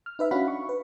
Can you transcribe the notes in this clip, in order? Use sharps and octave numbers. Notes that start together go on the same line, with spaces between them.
F6
D#4 B4 E5
C#4 D4 F#4 F5 F#5 B5
C#6
B4